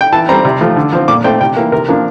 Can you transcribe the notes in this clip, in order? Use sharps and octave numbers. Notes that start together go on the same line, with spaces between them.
G5
E3 A5
G3 C4 A#5
C3
F3 A3
D3
F3 C4
A#2 D6
A3 C4 G5
C3 G5
E3 A#3
C3 A#4
F3 A#3 D4